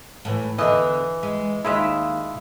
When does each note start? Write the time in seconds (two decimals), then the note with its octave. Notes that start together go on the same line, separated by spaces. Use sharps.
0.25 A2 E3
0.58 E2 D3 E3 D#5
1.23 G#3
1.65 D#2 G#3 E4 F4 E5